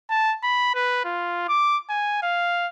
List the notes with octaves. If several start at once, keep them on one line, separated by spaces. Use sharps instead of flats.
A5
B5
B4
F4
D6
G#5
F5